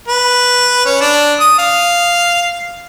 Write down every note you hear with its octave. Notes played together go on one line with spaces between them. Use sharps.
B4
C#4
D4
D#6
F5